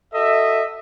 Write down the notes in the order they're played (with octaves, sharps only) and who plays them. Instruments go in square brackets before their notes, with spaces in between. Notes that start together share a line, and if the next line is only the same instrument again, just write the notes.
[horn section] F#4 A4 D#5 E5